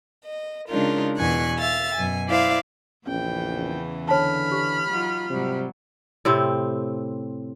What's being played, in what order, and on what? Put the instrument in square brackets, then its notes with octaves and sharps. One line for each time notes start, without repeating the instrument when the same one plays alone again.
[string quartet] D#5
C#3 G#3 D4 D#4 F4 A#4
E2 B2 E3 G#5 C#6 F#6
E5 F5 A6
F#2 B2 G#5
E4 C5 D5 E5 F5
[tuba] A#1 [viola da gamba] E2 C#3 E3 [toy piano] C#4 [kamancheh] G5
[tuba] D3 [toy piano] C#5 A5 [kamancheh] B5 F6
[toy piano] G4
[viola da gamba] F#3 D#4 F4
[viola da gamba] G#2 F#3 G3 [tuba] C3
[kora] A2 C3 C4